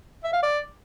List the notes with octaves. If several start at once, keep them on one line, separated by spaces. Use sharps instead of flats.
E5
F5
D5